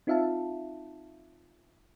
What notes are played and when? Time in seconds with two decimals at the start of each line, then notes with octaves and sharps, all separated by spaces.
0.07 C4 D#4 F4 E5 F5 A5